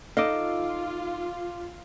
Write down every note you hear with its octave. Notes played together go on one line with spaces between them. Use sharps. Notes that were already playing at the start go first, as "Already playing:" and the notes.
D#4 F4 A4 D#5 F5 D6